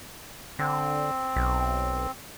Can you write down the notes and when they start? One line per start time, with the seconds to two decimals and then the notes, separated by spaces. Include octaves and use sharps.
0.59 D3 C4
1.36 B1